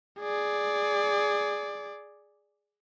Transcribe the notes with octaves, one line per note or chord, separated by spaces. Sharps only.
G#4 D5